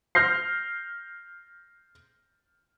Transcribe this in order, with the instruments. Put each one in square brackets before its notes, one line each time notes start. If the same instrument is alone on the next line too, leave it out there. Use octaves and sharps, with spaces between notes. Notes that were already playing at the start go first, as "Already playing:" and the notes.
[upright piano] F6 G6 A#6 C7